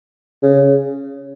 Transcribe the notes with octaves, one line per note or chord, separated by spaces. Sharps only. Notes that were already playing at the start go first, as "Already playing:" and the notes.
C#3